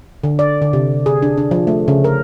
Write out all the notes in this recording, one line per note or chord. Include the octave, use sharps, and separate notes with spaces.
D3
D5
D3
C3
G#4
D4
D4
F3
A3
C#3
A#4